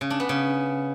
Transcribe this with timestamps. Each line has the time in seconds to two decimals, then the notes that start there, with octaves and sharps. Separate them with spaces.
0.01 C#3
0.10 D4
0.20 B3
0.29 C#3